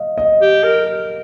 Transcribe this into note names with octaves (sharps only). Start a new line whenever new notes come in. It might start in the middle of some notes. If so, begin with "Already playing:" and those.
Already playing: D#5 F5
D#5
G4
A#4